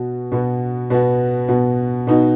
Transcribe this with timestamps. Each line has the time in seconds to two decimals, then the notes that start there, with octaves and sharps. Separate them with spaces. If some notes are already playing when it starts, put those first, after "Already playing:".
Already playing: B2 B3 F#4
0.32 B2 B3 F#4
0.90 B2 B3 F#4
1.49 B2 B3 F#4
2.07 B2 B3 D#4 F#4